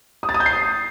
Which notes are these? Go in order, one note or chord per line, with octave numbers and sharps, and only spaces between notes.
D#6
A6
D#6
G6
C7